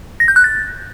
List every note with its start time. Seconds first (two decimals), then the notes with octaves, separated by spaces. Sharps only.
0.20 A#6
0.28 G6
0.36 F#6
0.44 A6